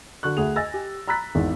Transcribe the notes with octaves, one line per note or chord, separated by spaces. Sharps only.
D3 F#4 C#6 F#6
D2 G#4 F#5 F7
D#5 G#5 E6 A6 A#6
G4
A#5 B5 E6 F#6 A6 B6
G#1 E2 D#3